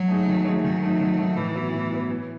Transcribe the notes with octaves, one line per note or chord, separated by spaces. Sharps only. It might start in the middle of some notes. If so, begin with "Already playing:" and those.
Already playing: F#3
A3 D#4 G#4 C#5
D#3
A3 D#4 G#4 C#5
D#3 F#3
A3 D#4
D#3
A3 D#4
A2 E3
F#3 B3
A2
F#3 B3
E3